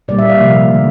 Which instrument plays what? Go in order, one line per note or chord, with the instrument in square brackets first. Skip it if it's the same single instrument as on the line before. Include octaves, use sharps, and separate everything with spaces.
[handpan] A#2 G3 A#3 D5
E5
F5
C3 F3 A#3
D3 A3